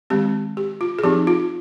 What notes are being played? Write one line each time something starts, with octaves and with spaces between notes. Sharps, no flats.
D#3 G#3 C4 G4
G4
F4
G#4
F3 C4 D#4 G4
F4